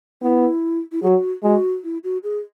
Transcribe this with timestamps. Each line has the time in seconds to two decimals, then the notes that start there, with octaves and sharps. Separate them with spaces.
0.22 B3 E4
0.92 E4
1.02 F#3 F#4 G#4
1.43 G#3 F#4
1.84 E4
2.04 F#4
2.23 G#4